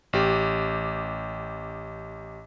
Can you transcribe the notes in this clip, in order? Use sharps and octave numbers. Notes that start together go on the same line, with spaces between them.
A1 G4